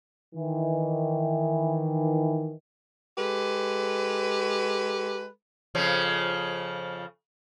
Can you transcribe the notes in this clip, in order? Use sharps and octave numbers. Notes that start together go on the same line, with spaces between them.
D#3 E3
G#3 G4 A4 B4
F2 C#3 F3